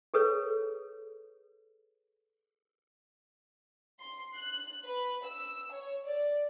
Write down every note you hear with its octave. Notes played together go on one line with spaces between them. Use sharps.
G#4 A4 B4 C#5
C6
F#6
B4
E6
C#5
D5